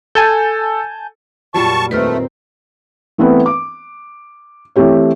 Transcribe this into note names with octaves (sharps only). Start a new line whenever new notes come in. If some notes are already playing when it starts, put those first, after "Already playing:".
A4 G#5 A5 G6
F2 A#2 F#3 G3 F4 A5 C#6
D#2 A#2 A3 C4 D#4 A#4 B4 F6
E3 A3 B3 C4 B4
D6
E3 A3 C4 G4 C#5